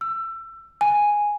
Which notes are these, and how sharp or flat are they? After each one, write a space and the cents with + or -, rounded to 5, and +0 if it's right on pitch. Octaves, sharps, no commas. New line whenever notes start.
E6 +25
G#5 -5